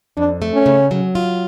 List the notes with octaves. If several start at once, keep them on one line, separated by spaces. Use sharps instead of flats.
F2 D4
A3
C#4
C#3
F#3
F4